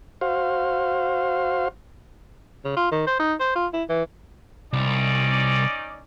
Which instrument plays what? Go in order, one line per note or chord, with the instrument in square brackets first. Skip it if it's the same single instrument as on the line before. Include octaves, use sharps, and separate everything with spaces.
[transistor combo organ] F#4 C5 F5
[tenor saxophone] C#3
F4
D#3
C5
D#4
C5
F4
E4
E3
[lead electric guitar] C2 [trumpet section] C#4 D#4 D5